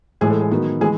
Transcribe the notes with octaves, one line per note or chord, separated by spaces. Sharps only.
A2 E3 G#3 G#4
A4
G#4
D#3 F#3 B3
E3 G#3 G#4